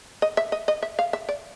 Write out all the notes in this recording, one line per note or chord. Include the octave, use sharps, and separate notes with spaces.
D#5
E5
D#5
D#5
E5
F5
E5
D5